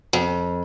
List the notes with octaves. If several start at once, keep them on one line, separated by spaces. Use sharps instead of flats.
F2